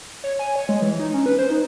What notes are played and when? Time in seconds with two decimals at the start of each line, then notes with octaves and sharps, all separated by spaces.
0.24 C#5
0.39 G#5
0.56 C#5
0.69 G#3
0.82 E3
0.99 D#4
1.14 C#4
1.26 B4
1.39 C5
1.50 D#4